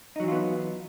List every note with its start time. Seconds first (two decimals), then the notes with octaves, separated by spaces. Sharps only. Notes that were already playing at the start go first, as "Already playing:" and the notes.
0.16 D#4
0.20 F#3
0.24 E3
0.28 F4
0.32 B3